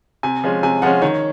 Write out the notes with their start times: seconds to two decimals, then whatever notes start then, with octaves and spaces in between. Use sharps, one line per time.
0.23 C3 G#5
0.44 F3 G#3 C#4
0.63 C3 G#5
0.82 F3 G#3 C#4 F#5
1.02 D#3 C#5